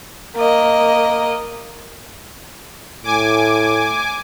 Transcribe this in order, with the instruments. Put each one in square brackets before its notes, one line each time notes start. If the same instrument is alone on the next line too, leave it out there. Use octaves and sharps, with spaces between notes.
[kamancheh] A#3 D#5
[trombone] A2 [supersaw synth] G#5 D6